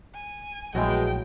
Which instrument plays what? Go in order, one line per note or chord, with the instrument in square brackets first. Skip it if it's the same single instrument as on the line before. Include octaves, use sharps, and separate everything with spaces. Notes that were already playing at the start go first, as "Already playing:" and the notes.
[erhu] G#5
[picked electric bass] A#1 [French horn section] B2 G#3 [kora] F#3 A3 E4 [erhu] G5